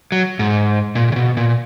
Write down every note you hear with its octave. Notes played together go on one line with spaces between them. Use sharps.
F#3
G#2
A#2
C#3
B2
A#2